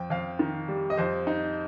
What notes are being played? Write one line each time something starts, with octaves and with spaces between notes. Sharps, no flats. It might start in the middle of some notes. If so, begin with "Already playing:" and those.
Already playing: F2 G5
F2 F5
D#3
G3
D#5
F2 C5
D#4